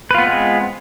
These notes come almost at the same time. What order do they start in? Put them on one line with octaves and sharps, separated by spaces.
B4 F4 B3 C4 G#3